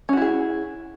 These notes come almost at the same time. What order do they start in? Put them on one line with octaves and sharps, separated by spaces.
C#4 F#4 E4 G#4